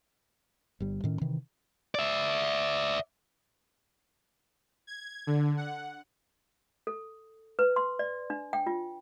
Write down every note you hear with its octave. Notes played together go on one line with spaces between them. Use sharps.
G1 G3
A2 D#3 C#4
C3 D#3 E3
D5 E5
G#6
D3
F#5
A4
B4
C6
D5
D4
G5
F4